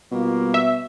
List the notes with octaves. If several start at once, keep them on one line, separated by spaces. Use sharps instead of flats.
B2 G3 A#3 F4
E5